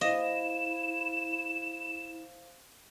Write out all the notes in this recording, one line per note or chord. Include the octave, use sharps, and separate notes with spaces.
E4 C5 D#5 F5 E7